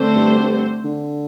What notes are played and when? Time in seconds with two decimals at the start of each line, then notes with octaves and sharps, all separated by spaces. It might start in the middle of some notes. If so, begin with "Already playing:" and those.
Already playing: D3 A3 C4 A4 C5
0.16 G2
0.39 G2
0.85 D3